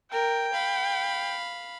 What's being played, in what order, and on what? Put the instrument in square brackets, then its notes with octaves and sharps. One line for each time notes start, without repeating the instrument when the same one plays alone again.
[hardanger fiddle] A#4 [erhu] G5
[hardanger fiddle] F5 B5